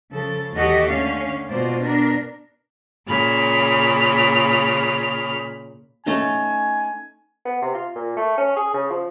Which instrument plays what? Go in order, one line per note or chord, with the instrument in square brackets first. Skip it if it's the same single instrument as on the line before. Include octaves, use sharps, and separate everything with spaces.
[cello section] C#3 F3 A4
D#2 E3 F#4 G4 A4 D#5
D3 A3 C#4 F5
B2 A#3 F4 C5 D5
B3 D4 A#4
[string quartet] A#2 C#3 B5 F6
[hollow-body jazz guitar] A3 C#4 D#4 [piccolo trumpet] G#5
[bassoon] B3
C3
F4
A#2
A3
C#4
G#4
C#3
F3